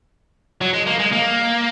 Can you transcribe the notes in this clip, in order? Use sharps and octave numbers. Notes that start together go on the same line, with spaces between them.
F#3
G#3
A#3
G#3
A#3